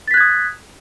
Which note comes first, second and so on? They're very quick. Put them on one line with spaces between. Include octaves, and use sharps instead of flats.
A6 B6 F#6 G#6 D#6